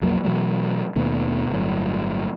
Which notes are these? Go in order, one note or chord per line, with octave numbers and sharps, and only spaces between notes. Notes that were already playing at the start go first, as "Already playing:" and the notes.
B1 F2 F#3 A#3
B2 E3 F#3 A3
D#2 B2 D#3 A3
G1 A2 F#3